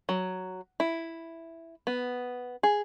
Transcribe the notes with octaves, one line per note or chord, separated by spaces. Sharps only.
F#3
E4
B3
G#4